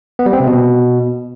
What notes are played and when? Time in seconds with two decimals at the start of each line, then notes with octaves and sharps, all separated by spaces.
0.19 B3
0.26 G3
0.33 C4
0.40 C3
0.47 B2